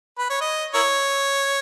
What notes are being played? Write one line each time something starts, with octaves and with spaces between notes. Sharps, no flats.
B4
C#5
D#5
E4 A#4 C#5